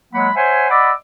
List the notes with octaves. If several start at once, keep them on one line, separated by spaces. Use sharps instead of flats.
F#3 G#3 A#3 F#5 B5
C5 C#5 E5 F#5 G#5
D5 D#5 F#5 B5 D6 E6